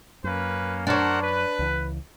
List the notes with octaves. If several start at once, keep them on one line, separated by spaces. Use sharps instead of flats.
F#2 A#3 C#4 B4
D4 A#4 C5 C#5 F#5
B4
C#2 E3